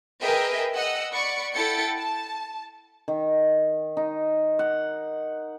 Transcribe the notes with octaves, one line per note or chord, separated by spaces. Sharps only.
G#4 A#4 B4 D#5 E5 G5
D#5 F#5 E6
D5 F#5 B5 C#6 C#7
E4 A4 F#5 G5 A6 C#7
A5
D#3
D#4
F#5